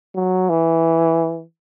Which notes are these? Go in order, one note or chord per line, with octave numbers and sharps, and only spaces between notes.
F#3
E3